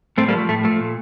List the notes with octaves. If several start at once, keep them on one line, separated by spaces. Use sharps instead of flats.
A2 A3 C4
G3 A#3
F3 A3
A2 A3
F3 A3
A#2